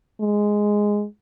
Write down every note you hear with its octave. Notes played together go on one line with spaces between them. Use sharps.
G#3